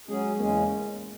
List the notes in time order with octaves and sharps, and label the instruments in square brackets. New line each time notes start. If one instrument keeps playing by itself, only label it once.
[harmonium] F#3 C#4 G#4 [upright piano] G#3
[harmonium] E2 C#3 G#3 C#4 [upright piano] A#3